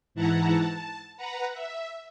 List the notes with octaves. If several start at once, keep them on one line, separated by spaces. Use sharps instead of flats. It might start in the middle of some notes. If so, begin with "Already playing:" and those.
G#2 E3 E4 F#5 A5 A#5
A5
B4 F#5 A#5
E5